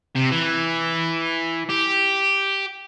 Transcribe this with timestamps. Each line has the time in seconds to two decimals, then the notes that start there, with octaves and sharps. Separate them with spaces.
0.16 C3
0.31 E3
1.69 G4